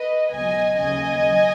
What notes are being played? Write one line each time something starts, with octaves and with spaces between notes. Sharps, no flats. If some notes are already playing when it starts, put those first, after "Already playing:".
Already playing: B4 D#5
C#2 B2 F#3 D#5 G#5
D#2 C#3 F#3 D#5 G#5
F#3